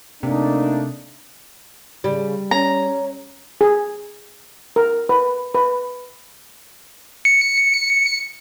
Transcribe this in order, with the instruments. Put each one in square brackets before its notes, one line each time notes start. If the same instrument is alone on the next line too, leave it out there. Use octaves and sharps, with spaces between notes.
[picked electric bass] C3 [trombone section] A3 A#3 D4 [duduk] D#4
[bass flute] C#3 [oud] G3
[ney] C#4 [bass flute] C#5 [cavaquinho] A#5
[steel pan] G#4
A#4
B4
B4
[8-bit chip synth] C#7